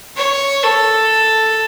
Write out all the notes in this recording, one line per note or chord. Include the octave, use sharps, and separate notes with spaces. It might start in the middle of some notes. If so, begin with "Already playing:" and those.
C#5
A4